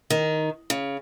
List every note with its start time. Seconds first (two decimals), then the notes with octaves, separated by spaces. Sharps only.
0.10 D#3
0.70 C#3